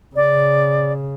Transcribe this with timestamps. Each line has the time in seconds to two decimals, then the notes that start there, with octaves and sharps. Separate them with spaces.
0.16 C#3 D5